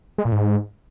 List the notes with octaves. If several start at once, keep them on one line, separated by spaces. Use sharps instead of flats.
G#3
A#2
G#2